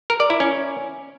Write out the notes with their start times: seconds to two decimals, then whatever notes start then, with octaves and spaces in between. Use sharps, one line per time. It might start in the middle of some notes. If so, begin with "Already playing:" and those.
0.10 A#4
0.20 D5
0.30 E4
0.40 C#4